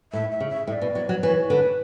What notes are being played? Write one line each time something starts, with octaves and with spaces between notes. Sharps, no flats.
A2 E5
E5
C#3
E5
A2 E5
D5
B2
F#3
F#3
E3 C#5
D3 B4